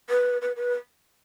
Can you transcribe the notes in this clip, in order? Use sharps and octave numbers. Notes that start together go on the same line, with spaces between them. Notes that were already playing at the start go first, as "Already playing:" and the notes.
B4
B4
B4